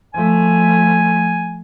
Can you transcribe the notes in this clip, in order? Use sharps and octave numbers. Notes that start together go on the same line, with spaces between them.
F3 A3 G#5